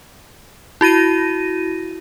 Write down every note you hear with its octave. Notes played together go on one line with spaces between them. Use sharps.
E4 F#4 A#6 D#7